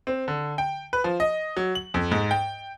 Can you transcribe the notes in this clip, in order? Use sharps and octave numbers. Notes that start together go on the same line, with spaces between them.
C4
D3
G5
B4
F3
D#5
F#3
F#7
F2
G#2
G5